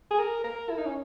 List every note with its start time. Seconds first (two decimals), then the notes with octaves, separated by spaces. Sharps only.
0.10 G#4
0.19 A#4
0.44 A#4
0.70 E4
0.78 D#4
0.86 C#4